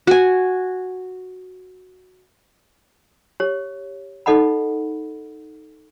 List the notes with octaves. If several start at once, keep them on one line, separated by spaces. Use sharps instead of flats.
F#4 G#5
G4 C#5
D#4 A4 D#5 F#5 B5